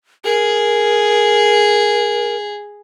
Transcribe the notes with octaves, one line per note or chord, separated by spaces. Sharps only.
G#4 A#4